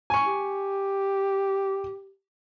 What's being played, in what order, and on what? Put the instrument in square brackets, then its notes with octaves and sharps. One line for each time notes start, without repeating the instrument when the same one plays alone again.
[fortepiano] G#5 C#6
[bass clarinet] G4